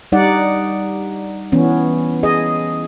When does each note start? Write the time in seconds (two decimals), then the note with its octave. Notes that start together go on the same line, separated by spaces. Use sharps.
0.12 G3 D#4 D5 F#5
1.52 E3 B3 C#4
2.23 G#4 D#5